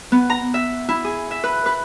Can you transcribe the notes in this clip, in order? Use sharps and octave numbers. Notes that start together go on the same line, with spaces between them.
B3
A#5
E5
E4
G#4
E5
B4
B4